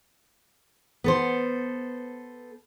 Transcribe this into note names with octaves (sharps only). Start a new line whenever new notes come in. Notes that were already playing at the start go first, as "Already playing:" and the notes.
B3 A4 C5